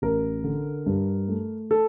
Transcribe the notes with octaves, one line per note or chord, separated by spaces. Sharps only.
A1 A#4
D3
G2
A3
A4